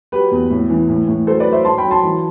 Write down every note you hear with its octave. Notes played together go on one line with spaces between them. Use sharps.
F#3 G4 B4
E2
A2
E3
A2
A2
F#3 A4 C5
B4 D5
F#3
C5 E5
F#3 A5 C6
G5 B5
F#3
A5 C6
E3